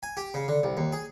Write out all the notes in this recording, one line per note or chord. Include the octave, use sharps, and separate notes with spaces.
G#5
G4
C#3
D3
C2
D#2
G#4